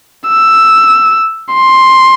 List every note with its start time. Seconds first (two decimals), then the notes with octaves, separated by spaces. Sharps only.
0.29 E6
1.54 C6